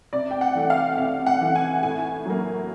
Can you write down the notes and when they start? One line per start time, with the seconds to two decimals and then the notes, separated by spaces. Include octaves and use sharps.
0.13 C3 D5
0.31 G5
0.41 F#5
0.55 E3 A3
0.70 F5
0.98 C3 F5
1.26 F#5
1.41 E3 A3
1.55 G#5
1.83 A2 G#5
2.26 F#3 A#3